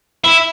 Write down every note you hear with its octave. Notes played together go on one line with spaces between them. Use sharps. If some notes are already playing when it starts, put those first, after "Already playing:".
E4